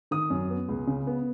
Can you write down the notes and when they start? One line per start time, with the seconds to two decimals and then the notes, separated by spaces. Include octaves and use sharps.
0.11 D#3 D#6
0.30 F#2
0.50 B3
0.69 C#2
0.87 C#3
1.07 B3